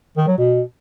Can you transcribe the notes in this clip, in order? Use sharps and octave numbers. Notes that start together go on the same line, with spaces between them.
D#3
F#3
B2